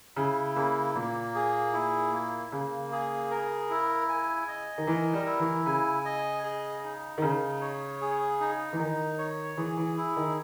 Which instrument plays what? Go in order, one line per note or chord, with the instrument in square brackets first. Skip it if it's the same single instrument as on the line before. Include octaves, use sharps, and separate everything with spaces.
[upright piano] C#3 [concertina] E4
[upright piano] C#3 [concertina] A#3
[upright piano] A#2 [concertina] A#3
[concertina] G#4
E4
A#3
[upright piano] C#3 [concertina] A#3
[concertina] G#4
A#4
E4
G#5
D#5
[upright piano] D#3
[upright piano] E3 [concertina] A#4
[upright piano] G3
[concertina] E4
[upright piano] E3
[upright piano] C#3 [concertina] G#5
[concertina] D#5
G#4
D#4
[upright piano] D#3
[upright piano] C#3 [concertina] D#4
[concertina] C#5
G#4
D#4
[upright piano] E3
[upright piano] D#3 [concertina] D#4
[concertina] C#5
[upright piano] E3 [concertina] G#4
[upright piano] E3
[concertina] E4
[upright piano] D#3